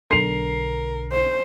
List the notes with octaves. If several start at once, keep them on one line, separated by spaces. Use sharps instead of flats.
B1 D3 A#4 C7 F7
C5